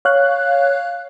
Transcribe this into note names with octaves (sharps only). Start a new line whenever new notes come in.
C#5 F5 F#6